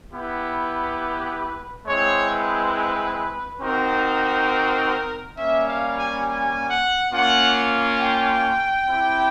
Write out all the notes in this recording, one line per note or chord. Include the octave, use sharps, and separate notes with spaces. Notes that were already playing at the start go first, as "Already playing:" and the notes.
B3 E4 G4 B4
G#3 C4 E4 C#5
B4
C4 D#4 F#4 A#4
G3 A#3 C#4 E5
F5
G#5
G#5
F#5
A#3 C#4 F4 F#5
G5
C4 E4 G4